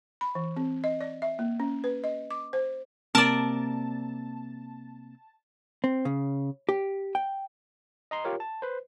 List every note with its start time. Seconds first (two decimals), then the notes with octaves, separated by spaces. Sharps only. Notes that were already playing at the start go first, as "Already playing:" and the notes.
0.21 B5
0.35 E3
0.56 C4
0.84 D#5
1.01 D5
1.22 E5
1.39 A#3
1.60 C#4
1.84 B4
2.04 D#5
2.31 D6
2.53 C5
3.15 C3 A#3 C4 A#4 D5 A5
5.84 C4
6.05 C#3
6.69 G4
7.15 G5
8.11 D#5 A#5 C6
8.24 F4 G4 A#4 C#5
8.40 A5
8.62 B4 C5